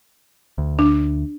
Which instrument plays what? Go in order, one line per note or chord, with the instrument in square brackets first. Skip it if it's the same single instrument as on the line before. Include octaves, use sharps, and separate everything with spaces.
[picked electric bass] D2
[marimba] D4